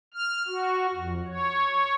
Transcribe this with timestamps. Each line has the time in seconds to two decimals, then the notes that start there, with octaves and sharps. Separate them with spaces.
0.14 F6
0.47 F#4
0.94 F2
1.27 C#5